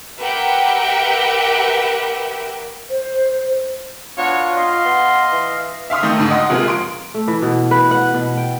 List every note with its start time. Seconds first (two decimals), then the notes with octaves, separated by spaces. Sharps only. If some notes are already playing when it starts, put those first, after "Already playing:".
0.18 G4 A#4 B4 E5 F#5 G5
2.90 C5
4.18 B3 D4 F4 F#4 C#5
4.56 D#5 F5 C6
4.85 B3
5.33 E3
5.90 E5 F5 C6 D#6
6.03 D#3 A3 D#4
6.17 D2 G#2
6.30 D#5 F#5 C6 D#6
6.50 C3 F3 G#3 A#3 F4 B4
6.68 C6 D7
7.14 A3
7.28 E3
7.42 B2
7.71 B4
7.91 F#5
8.14 B2
8.37 G5